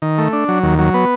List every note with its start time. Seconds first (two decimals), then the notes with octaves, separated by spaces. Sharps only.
0.02 D#3
0.18 A3
0.33 D4
0.48 F#3
0.63 D#2
0.79 F#3
0.94 B3